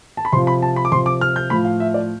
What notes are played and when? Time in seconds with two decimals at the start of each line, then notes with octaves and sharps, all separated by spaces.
0.17 A5
0.25 B5
0.32 C3 F3 C6
0.47 B5
0.62 A5
0.76 B5
0.85 D6
0.92 C3 F3 C6
1.06 D6
1.21 F6
1.36 G6
1.50 A2 F3 B5
1.65 F5
1.80 E5
1.94 D5